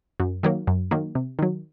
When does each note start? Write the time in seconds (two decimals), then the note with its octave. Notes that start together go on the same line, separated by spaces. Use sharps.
0.20 F#2
0.43 D#3 F#3 A#3
0.67 F#2
0.91 D#3 F#3 A#3
1.15 C3
1.39 D#3 F#3